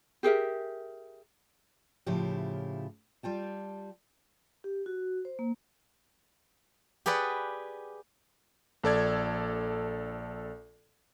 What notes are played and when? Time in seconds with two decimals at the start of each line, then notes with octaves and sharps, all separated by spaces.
0.23 G4 G#4 A#4 E5
2.06 A2 C#3 F3 E4 F4 G4
3.23 G3 F4 G5 A5
4.64 G4
4.86 F#4
5.25 C5
5.39 A#3
7.06 G4 G#4 B4 D5 F#5
8.84 A#1 A4 D5 G#6